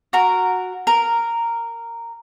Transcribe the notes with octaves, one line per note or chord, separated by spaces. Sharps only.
F#4 A#4
A#4